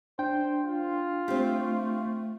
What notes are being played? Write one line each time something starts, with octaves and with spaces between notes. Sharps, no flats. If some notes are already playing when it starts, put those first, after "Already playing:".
D4 C5 G5
F4
A3 C4 G4